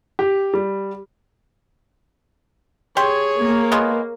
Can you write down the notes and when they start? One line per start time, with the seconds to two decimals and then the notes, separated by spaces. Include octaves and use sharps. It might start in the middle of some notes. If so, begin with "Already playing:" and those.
0.19 G4
0.54 G3
2.97 G4 G#4 C#5 C6
3.41 A#3
3.72 G#3 B3 F4